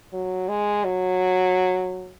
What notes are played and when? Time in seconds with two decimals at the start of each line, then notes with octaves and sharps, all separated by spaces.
0.13 F#3
0.49 G#3
0.84 F#3